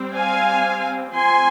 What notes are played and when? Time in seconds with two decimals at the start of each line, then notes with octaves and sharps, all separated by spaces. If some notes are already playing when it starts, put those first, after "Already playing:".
Already playing: G3 C4
0.14 F5 G#5
1.13 F3 C4 G#5 C6